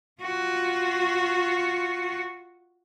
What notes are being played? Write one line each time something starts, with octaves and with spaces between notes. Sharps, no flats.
F4 F#4